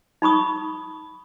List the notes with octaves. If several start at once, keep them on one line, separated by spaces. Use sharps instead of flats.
D#4 B5 C#6 D#6